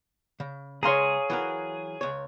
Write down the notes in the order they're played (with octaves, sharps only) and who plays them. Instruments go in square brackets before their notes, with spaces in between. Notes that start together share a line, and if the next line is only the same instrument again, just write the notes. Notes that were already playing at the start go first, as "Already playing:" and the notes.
[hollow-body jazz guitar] C#3
[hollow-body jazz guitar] C#2 G#3 C6 [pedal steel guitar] G#4 [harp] C#5 F5 A#5
[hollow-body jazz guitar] E3 F#3 A#4
C#2 C#5